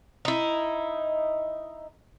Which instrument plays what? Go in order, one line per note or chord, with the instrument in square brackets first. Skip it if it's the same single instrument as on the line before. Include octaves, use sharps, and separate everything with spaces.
[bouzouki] D#4 E4